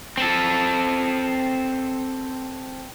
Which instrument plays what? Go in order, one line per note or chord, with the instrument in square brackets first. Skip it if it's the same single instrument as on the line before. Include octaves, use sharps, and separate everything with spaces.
[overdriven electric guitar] C4 A4